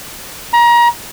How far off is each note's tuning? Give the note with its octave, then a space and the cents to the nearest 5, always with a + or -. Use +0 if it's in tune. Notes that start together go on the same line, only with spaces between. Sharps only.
A#5 +30